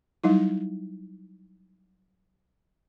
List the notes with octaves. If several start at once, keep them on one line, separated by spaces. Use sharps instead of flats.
F#3 G3 D#4 E4